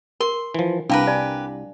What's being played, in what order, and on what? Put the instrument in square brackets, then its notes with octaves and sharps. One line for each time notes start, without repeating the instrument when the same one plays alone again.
[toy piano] A#4 [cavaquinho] C6
[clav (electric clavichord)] E3 F3
[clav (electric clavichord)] C2 [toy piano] D4 F5 A5 [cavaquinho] G4 A#4 B4
[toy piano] D5 G#5